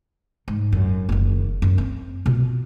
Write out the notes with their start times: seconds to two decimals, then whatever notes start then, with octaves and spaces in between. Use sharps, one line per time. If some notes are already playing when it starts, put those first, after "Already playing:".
0.48 G#2
0.72 F#2
1.09 F#1 D#3
1.62 F#2
1.78 C4
2.26 B2 F4